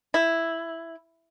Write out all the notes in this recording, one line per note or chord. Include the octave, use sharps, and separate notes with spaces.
E4